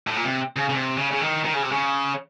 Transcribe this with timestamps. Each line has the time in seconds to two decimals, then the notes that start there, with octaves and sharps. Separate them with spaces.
0.07 A2
0.16 A#2
0.25 C3
0.56 C#3
0.69 C#3
0.72 C3
0.97 C#3
1.11 C#3
1.21 D#3
1.45 D#3
1.53 C#3
1.62 C3
1.71 C#3